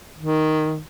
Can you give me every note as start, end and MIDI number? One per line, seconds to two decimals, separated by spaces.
0.18 0.80 51